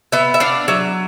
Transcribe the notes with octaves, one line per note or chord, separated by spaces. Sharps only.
B3 E5
E5
D4 F5
F#3 E5